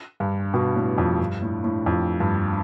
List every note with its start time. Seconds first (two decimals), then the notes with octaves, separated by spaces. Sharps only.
0.20 G2
0.54 B2
0.75 A2
0.98 F2
1.20 G2
1.42 A2
1.64 A2
1.86 F2
2.20 G2